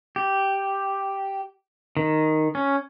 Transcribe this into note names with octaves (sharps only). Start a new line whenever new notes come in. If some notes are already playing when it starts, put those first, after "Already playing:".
G4
D#3
C#4